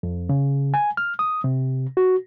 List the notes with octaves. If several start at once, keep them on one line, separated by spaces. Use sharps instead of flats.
F2
C#3
G#5
F6
D#6
C3
F#4